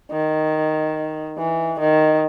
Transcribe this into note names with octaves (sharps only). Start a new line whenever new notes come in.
D#3
E3
D#3